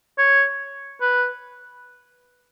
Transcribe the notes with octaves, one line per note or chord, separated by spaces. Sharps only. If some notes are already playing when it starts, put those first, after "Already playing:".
C#5
B4